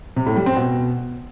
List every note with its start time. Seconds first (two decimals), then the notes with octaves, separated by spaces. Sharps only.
0.16 C3
0.26 A2
0.36 G3
0.46 C4
0.56 B2